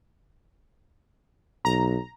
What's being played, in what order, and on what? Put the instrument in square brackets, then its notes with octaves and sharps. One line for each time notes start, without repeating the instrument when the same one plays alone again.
[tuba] B1 [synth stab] A#5